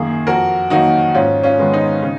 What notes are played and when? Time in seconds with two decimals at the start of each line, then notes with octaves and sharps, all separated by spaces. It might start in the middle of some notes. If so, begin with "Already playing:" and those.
Already playing: F#2 D#3 A#3 G#4
0.27 F2 F#4 A#4
0.70 D#3 F#3 A#3 D#4 F#4
1.15 G#2 C#4 F4
1.43 C#4 F4
1.58 D#3 G#3 B3
1.74 D#4
2.02 C#3